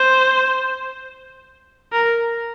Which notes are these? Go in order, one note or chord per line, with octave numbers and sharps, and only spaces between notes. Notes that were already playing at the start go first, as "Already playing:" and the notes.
Already playing: C5
A#4